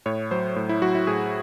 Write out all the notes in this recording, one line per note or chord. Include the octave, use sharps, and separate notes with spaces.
A2 C#5
F#3 C5
A2
E4
F#3 F#4
E4
A2 G#4